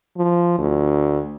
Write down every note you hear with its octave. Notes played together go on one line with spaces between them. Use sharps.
F3
D2